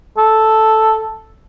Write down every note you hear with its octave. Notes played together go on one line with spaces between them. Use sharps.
A4